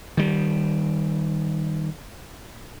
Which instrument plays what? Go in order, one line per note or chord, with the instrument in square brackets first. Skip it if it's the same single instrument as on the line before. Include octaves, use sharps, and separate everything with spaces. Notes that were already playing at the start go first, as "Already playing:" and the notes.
[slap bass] D#3 G3